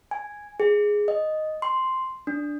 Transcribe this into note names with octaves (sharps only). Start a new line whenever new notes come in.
G#5
G#4
D#5
C6
D4